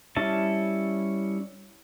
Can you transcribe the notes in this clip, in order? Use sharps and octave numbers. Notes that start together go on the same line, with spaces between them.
G3 C#4 E4 A5